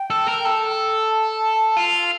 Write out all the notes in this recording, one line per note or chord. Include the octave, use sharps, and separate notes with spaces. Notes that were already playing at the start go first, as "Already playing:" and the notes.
Already playing: G5
A4
A#4
A4
A5
F4